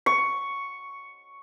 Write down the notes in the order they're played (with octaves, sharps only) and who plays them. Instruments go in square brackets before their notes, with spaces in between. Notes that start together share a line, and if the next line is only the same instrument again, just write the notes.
[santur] C#6